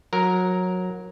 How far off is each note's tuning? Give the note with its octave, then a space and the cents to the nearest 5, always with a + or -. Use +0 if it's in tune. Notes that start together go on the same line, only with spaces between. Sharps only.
F#3 -20 A#4 +0